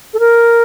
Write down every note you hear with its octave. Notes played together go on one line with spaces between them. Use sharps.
A4
A#4